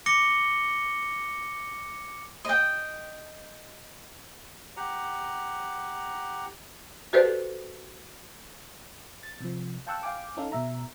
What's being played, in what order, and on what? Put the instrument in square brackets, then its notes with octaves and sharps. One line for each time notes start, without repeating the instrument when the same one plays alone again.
[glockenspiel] D6 A#6 C#7 G7
[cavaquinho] D#5 G5
[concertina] G4 F#5 A#5
[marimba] F#4 G4 A4 B4 C5 D5
[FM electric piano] A6
C3 F3
F5 G5 A5 C#6 E6 F#6
F5 G5 G#5 D6
C#4 D#4 A4 F5
B2 E5 A#5